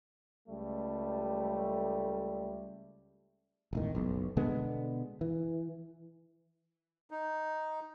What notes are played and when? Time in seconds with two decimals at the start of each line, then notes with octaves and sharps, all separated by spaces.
0.48 C#2 G3 A3
3.73 E1 A1 D#3
3.95 F#1 B1
4.37 B2 D3 G#3 B3
5.21 E3
7.11 D#4